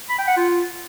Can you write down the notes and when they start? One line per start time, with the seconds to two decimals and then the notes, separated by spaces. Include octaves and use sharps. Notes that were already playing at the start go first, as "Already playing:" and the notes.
0.10 B5
0.19 G5
0.28 F#5
0.37 F4